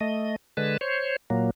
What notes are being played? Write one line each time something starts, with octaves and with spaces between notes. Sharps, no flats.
A3 D#5
D3 G#3 B4 A5
C5 C#5
A#2 F#3 A#3